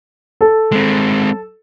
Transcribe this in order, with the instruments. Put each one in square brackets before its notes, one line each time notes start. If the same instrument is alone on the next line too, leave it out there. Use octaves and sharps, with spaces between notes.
[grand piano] A4
[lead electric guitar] G#3 C4